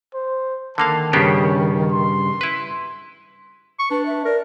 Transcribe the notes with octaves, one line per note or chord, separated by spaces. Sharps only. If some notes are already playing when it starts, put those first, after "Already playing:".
C5
D3 D#3 A#3 F5 A5
G2 C#3 A#3 B3 C#4 G4
C6
E4 B4
C#6
D4 B4
E5
A#4 D5